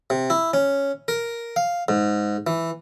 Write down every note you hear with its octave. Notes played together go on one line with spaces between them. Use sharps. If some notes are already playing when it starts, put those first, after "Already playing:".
C3
E4
C#4
A#4
F5
G#2
E3